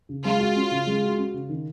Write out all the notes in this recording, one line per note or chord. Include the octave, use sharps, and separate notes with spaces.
C#3
G#3 F4
F#4
C#4
C#3
G#3
F#4
C#4
C#3
D#3